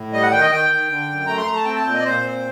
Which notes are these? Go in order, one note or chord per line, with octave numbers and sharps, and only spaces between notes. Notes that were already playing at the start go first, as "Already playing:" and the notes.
Already playing: A2
G3 D#5
F#5
D#3 G5
D#5
D#3 G5
D#3
D3
F#2
A3 A#5
C6
A3 A#5
A5
C4 G5
A5
A#2 G5
D#5
D5
A#2 C5
C4